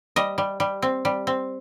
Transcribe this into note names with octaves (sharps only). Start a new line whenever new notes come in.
G3 D#5
G3
G3
C4
G3
C4